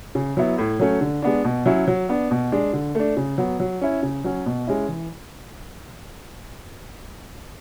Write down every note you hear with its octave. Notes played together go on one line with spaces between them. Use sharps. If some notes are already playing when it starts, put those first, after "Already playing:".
C#3
F#3 B3 E4
A2
F#3 A3 C#4
D3
G#3 B3 D4
B2
F#3 C#4 E4
F#3
B3 D4
B2
G#3 D4
D3
A3 D4
C#3
F#3 B3
F#3
C#4 E4
C#3
F#3 C#4
B2
G#3 C#4 E4
E3